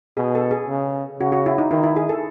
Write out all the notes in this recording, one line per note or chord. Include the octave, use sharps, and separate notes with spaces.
B2 G#4
A4
G#4
C#3
C#3 F#4
F#4
E4
D#4
D#3 E4
E4
G#4
A4